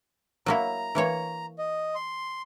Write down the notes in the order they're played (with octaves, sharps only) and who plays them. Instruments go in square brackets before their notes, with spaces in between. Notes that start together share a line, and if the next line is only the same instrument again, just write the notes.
[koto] F#3 A#3 E4 [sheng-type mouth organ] A#5
[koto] E3 A#3 C#5
[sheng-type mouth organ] D#5
C6